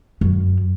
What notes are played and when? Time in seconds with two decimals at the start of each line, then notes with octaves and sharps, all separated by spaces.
0.21 F#2